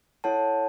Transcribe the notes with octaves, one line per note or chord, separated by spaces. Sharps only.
E4 A4 C#5 F#5 A5